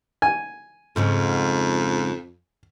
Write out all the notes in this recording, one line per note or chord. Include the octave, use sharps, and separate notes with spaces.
G#5
F2 G#2 C#3 F3